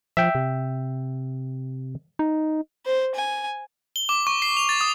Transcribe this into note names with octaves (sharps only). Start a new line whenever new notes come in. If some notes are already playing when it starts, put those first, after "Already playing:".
F3 E5 G5
C3
D#4
C5
G#5
G7
D6
C#6
C7
F7
A6
D#6